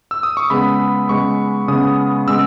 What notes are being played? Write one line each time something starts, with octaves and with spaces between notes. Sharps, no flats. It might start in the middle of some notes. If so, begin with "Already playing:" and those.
E6
D#6
C#6
C#3 G#3 B3 B5
C#3 G#3 B3 C#6
C#3 G#3 B3 D#6
C#3 G#3 B3 E6